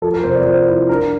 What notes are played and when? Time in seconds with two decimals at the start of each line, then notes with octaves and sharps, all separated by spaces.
0.02 F3 A4
0.13 A#4
0.24 C3 C5
0.35 D5
0.45 F3 C5
0.67 E4
0.89 D4 A#4